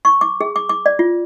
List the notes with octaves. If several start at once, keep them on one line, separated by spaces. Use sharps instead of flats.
C#6
D6
G#4
D6
D6
D5
F4